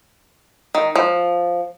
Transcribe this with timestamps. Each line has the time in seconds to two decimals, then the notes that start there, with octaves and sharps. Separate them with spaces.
0.75 D#3
0.96 F3